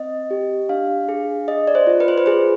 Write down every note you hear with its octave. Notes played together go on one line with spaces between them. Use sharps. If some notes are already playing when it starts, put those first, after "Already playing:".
Already playing: C4 D#5
G4
D4 F5
G#4
G#4 D#5
D5
C5
F4
B4
C5
B4
G#4 C5